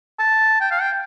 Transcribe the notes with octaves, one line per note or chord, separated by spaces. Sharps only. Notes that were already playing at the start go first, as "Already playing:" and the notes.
A5
G5
F5
G5